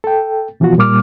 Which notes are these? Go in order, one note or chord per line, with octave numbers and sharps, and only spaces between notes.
A4 G5
B2 E3 F3 B3 F4 F#4
A#2 G3 A#3 D6 F6